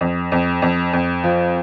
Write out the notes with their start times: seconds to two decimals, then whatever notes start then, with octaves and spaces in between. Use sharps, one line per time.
0.01 F2
0.32 F2
0.62 F2
0.93 F2
1.24 F3